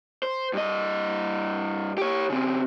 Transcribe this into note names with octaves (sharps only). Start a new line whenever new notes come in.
C5
G2 D#5
G4 C#5
C#3 C4